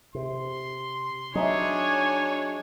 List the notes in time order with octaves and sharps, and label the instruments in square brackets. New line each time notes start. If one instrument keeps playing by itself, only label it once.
[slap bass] C3 [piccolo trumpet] C6
[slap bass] F#3 [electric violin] D4 C#5 [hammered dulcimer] D#4 G#4 E5 [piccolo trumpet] G#5